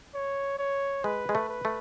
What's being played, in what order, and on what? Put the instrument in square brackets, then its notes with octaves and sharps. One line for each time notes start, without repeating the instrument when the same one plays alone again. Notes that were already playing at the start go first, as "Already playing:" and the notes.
[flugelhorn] C#5
C#5
[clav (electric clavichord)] G#3 [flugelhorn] B4
[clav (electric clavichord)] G#3
A3
[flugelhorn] B4
[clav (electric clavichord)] A3